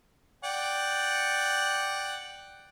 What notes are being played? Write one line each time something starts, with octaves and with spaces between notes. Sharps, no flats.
D5 F#5 G5